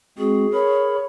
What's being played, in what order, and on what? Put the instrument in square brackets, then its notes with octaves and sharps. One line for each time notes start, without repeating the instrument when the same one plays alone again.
[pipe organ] G#3 C4 F#4 [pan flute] G#4
[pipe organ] A#4 B5 [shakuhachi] C#5